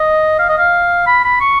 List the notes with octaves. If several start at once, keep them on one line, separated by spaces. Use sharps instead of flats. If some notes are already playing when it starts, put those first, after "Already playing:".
Already playing: D#5
F5
D#5
F5
B5
B5
C#6